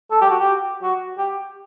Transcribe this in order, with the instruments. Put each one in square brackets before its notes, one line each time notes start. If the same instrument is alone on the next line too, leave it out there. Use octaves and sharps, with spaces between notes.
[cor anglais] A4
G4
F#4
G4
F#4
G4